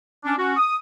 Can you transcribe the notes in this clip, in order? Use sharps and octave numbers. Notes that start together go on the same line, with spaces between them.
C#4 D4
C#4 F#4
D#6